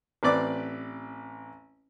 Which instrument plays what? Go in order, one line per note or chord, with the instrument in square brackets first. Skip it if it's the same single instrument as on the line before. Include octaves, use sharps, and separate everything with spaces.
[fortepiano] A1 C4 B4 D5 D6